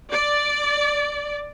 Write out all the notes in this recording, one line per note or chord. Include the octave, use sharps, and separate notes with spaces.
D5